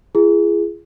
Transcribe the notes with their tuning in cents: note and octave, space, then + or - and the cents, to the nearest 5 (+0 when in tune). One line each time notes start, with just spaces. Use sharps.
F4 -45 G#4 +0